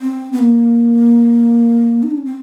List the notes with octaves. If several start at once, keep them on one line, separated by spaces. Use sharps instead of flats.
C4
B3
A#3
D#4
D4
C#4
C4